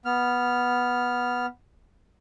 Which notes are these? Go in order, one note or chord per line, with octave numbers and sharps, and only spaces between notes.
B3 F6